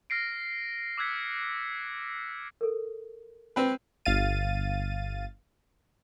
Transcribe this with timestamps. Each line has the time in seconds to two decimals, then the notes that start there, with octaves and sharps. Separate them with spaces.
0.10 F6 A#6 C7 D7
0.98 D6 E6 F#6 G#6 B6 C#7
2.61 A4 A#4
3.56 C4 B4
4.05 G1 F5 A6 D#7